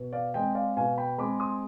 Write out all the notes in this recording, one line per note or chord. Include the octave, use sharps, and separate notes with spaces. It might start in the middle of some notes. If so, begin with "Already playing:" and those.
Already playing: B2
D5 F5
G#3 C4 D#5 G5
D5 F5
B2 F5 G#5
G5 B5
G#3 C4 B5 D6
C6 D#6